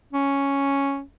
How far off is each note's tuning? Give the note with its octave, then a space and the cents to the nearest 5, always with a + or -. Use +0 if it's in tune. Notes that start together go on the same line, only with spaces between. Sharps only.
C#4 +0